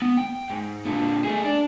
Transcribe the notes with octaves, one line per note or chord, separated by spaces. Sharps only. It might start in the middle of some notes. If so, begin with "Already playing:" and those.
B3
G5
G#2
A#2 D3
A3 G#4
D4